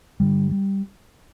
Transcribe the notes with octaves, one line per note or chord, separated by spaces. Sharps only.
G2 D3 G3
G3